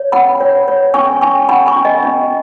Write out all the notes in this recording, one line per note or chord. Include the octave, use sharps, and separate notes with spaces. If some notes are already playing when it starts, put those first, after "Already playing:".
Already playing: C#5
C#4 F#5 B5
C#5
C#5
C#4 G#5 C#6
C#4 G#5 C#6
C#4 F#5 B5
G#5 C#6
C#4
D#5
C#4